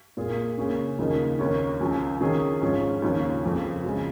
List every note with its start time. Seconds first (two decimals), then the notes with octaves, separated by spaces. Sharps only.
0.17 A#2 A#3 F4 G#4
0.58 C#3 A#3 C#4
0.99 D#2 C#3 F3 A#3 D#4
1.39 D#2 D#3 A#3 C#4
1.81 C#2 C#3 F3
2.21 D#3 C#4 G#4
2.61 G#2 F3 C#4 F4
3.02 D#2 C#3 F3 C#4 F4
3.43 F2 C#3 F3
3.84 C#3 F3 G#3 F4